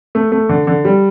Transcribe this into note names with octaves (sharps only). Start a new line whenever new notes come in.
A3
A3
D3
D3
G3